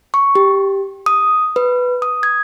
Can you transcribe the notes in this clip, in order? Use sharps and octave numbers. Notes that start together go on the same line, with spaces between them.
C#6
G4
D#6
B4
D#6
G#6